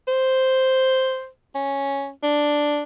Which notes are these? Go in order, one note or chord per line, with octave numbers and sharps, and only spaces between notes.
C5
C#4
D4